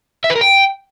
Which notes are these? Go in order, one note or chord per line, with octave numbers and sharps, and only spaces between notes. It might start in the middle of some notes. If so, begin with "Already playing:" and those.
E5
B4
A#4
G5